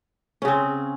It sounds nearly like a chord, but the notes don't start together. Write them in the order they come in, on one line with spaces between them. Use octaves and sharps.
C#4 C#3 C4